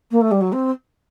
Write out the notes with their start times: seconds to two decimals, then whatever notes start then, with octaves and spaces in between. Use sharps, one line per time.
0.11 A#3
0.21 A3
0.31 G3
0.41 F#3
0.52 C4